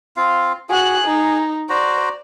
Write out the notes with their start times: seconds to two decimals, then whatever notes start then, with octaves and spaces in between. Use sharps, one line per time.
0.17 C4 F4 F5
0.69 F#4 G#4 F#6
1.05 D#4
1.69 F#4 C5 D5 A#5